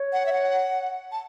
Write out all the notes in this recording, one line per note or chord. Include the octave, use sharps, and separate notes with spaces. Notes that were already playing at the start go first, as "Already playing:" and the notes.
Already playing: C#5
F#5
E5
F#5
A5